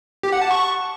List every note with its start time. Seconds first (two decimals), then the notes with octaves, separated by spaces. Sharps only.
0.23 G4
0.32 F#5
0.42 A5
0.51 C#6